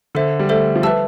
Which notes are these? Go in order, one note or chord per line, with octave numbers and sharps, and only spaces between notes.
D3 A4 C5 E5
G3
A3 A4 C5 E5
F3
G3 B4 E5 A5 E6